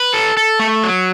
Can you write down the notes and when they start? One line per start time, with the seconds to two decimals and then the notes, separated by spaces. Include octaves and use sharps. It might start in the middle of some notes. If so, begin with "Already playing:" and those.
Already playing: B4
0.14 A4
0.37 A4
0.60 A3
0.83 F#3